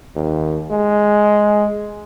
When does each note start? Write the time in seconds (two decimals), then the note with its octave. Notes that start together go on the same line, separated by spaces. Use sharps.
0.16 D#2
0.71 G#3